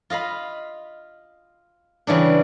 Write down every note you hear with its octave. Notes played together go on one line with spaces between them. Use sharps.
F4 D#5 F5 B5
C#3 E3 G3 D4